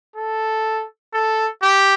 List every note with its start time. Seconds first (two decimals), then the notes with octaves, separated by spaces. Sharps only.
0.16 A4
1.13 A4
1.62 G4